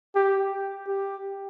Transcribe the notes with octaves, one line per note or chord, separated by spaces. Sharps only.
G4
G4